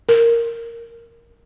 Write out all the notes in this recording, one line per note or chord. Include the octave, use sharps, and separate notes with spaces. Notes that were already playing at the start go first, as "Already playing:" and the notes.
A#4